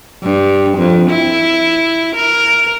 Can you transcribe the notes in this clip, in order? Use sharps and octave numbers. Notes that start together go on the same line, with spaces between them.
G2
F2
E4
A#4